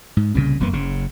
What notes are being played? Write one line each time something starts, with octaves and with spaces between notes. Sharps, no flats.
G#2
C2 A#2 C#3
E1 F#2 A#3 B3
F#1 C#3